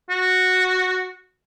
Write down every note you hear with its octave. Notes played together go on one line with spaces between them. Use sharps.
F#4